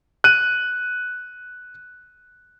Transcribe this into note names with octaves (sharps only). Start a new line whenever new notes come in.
F#6 D#7